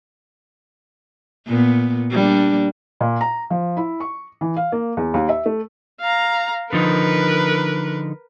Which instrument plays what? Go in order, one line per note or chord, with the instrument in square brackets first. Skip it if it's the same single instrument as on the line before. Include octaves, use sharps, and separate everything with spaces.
[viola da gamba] A#2 B3
G3 A#3 D4
[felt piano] A#2
A#5
F3
E4
C#6
E3
F5
A#3
E2
D#2
E5
A3
[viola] F5 A#5
[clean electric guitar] D3 F3 D#4 [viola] A#4 B4